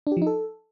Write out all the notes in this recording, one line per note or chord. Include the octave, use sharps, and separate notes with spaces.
D4
G4
F3
D#4
A4